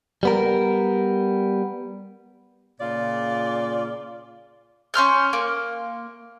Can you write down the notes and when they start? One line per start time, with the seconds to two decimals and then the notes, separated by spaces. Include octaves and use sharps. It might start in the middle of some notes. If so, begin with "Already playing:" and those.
0.23 G3 B3 A#4
2.80 A#2 C#3 F4 D5
4.94 C#4 C6 F6 G6
5.33 A#3